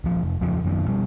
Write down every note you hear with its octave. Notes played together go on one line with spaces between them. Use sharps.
D#1 F3
F1
D#1 F2 C#3 F3
F#1 F#2 D#3
B2 G3